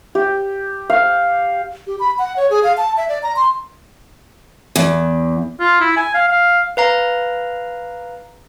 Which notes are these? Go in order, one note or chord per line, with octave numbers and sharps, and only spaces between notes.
G4
F5
G4
B5
F#5
C#5
G#4
F5
A5
E5
D5
A#5
C6
E2
F4
E4
G#5
F5
F5
B4 F5 A#5